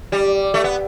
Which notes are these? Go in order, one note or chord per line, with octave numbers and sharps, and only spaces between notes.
G3
A3
B3